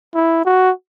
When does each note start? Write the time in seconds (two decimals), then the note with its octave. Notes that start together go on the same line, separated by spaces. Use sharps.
0.15 E4
0.46 F#4